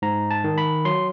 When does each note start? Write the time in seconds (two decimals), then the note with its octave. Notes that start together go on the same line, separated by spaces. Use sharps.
0.02 G#2 A#5
0.31 A5
0.44 D#3
0.58 B5
0.85 F#3 C6